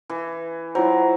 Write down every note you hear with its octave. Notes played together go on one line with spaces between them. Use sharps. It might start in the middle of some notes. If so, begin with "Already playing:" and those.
E3
F#3 E4 F4 C5